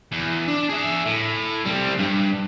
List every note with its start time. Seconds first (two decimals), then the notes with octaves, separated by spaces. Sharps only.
0.12 E2
0.48 D4
0.69 G#4 E5
1.06 A2
1.65 G3 C4
1.98 G2